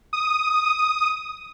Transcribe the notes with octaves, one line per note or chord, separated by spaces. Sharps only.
D#6